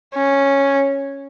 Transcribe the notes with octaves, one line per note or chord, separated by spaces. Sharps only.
C#4